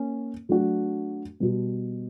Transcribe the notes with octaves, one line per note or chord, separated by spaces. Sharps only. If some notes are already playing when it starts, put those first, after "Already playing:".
Already playing: A#3 C#4
F#3 A3 D4 F#4
B2 G3 B3